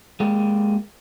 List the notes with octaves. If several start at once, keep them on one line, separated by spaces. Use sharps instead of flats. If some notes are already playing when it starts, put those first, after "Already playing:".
G#3 A#3 G4